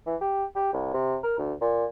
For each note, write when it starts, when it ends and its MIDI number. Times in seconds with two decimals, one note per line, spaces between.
0.06 0.16 52
0.21 0.45 67
0.56 0.73 67
0.73 0.89 36
0.94 1.17 48
1.24 1.34 70
1.38 1.53 38
1.61 1.85 46